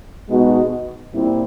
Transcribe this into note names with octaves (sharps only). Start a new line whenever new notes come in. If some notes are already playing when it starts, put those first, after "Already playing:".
B2 G#3 B3 D#4 F#4
A#2 G3 C4 E4